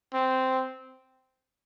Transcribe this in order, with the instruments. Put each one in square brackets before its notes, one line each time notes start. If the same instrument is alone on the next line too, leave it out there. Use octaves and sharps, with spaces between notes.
[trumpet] C4